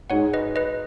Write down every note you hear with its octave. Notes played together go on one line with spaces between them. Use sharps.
G#2 G#3 D#4 F#4 C#5 F#5
B4 D#5
B4 D#5